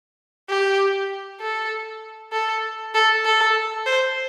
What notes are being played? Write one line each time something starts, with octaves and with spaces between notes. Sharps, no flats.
G4
A4
A4
A4
A4
C5